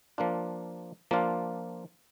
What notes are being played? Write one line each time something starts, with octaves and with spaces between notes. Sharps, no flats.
F3 A#3 D4 F4
F3 A#3 D4 F4